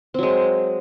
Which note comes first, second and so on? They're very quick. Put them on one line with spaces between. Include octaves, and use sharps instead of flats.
C4 F#3 G#3